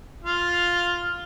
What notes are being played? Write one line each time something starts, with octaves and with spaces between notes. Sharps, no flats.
F4 F5